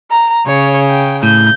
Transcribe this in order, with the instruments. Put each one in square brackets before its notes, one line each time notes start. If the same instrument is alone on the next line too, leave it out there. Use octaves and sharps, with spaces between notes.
[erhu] A#5
[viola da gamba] C#3 [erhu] C#5
[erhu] G5
[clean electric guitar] A2 [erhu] G6